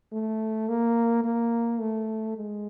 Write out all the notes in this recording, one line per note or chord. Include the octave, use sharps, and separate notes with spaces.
A3
A#3
A#3
A3
G#3